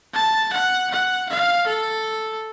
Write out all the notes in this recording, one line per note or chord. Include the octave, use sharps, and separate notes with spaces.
A5
F#5
F#5
F5
A4